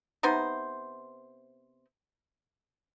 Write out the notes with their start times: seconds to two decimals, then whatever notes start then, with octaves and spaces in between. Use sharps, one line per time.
0.23 C3 B3 D#4 C5